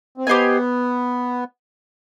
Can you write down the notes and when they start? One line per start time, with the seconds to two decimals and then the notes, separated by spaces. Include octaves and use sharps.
0.18 C4
0.27 B3 G4 C5 D#5 G#5